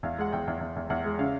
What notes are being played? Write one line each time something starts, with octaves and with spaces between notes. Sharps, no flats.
E2 F5
G#3 F#5
E2 G5
E2
E2
E2
E2 F#5
G#3
C#3 F5